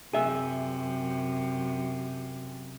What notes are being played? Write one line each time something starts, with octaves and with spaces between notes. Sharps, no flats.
F#2 C3 G#4 E5